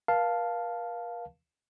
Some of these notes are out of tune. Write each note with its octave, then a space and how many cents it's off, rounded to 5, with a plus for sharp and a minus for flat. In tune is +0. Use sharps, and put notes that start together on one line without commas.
A#4 +45 F5 +0 A5 +0